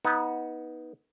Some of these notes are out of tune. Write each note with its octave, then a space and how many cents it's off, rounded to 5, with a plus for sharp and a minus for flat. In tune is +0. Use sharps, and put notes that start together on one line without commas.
B3 -10 D#4 +25